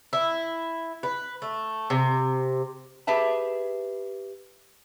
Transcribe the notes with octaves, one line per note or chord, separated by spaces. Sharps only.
E4
B4
A3
C3
G4 G#4 B4 E5 A5